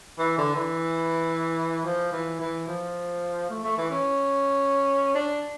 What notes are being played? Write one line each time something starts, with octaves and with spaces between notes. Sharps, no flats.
E3
D3
E3
F3
E3
E3
F3
A3
A3
E3
C#4
D4